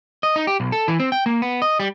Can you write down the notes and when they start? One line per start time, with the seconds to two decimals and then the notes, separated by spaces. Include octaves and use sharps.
0.23 D#5
0.36 D#4
0.47 G4
0.60 B1
0.72 A4
0.88 E3
1.00 C4
1.12 G5
1.26 A#3
1.42 B3
1.62 D#5
1.80 G3